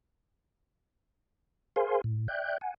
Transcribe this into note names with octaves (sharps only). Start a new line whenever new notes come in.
G#4 A#4 C5 F5 G#5 C6
A2
D5 E5 G5 F#6 G6
F#5 G#5